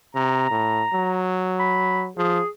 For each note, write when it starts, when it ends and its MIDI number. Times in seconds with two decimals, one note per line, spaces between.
0.15 0.51 48
0.15 1.22 82
0.51 0.84 45
0.94 2.10 54
1.59 2.04 83
2.17 2.40 53
2.17 2.49 68